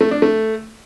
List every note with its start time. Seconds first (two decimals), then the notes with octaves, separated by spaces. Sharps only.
0.01 A3
0.11 D4
0.22 A3